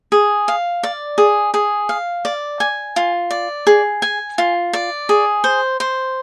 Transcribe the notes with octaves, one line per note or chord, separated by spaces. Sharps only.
G#4
F5
D5
G#4
G#4
F5
D5
G#5
F4
D5
G#4
G#5
F4
D5
G#4
C5
C5